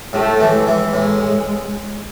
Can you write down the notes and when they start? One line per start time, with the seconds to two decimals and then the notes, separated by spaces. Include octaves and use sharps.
0.13 A2 A3
0.40 E3
0.53 G#3
0.67 E3
0.93 A2 G#3